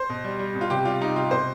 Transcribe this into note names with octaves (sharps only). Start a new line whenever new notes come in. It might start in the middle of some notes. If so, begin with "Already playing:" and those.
Already playing: C5
B2
G3
G3
B2
F4
C3 G4
G3 F4
G3 D#4
C3 F4
B2 C5